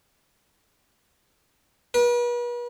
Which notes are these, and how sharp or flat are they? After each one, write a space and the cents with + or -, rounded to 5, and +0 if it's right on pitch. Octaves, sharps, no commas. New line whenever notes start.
B4 -40